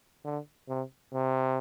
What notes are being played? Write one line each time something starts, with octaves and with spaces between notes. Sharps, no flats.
D3
C3
C3